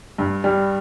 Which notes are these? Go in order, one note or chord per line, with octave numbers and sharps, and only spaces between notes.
G2
G3